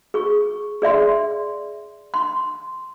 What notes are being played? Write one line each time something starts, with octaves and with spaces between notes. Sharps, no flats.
G#4 C#6
G#4 D5 E5 C6
C6